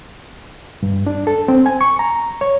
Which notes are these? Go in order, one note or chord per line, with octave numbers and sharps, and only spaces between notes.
G2
D4
A4
C4
G#5
C#6
A#5
C#5